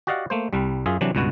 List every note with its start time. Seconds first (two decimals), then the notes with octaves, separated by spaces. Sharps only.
0.07 F#4 G4 D5 D#5 F5 F#5
0.30 A3 A#3 C5
0.53 C2 G3
0.86 F#2 F4 G#4 E5
1.01 C3 E3 F#3 D4
1.15 C#2 G2 B2 B3 F#4